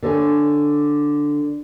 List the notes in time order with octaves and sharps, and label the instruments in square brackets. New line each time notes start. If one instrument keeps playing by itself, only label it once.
[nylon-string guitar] D3 A4 C#5 G#5